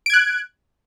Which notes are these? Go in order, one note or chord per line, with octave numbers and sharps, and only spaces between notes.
F#6 G#6 D7